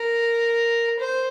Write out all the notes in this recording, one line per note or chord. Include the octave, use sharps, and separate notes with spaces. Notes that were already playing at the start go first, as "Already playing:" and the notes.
Already playing: A#4
C5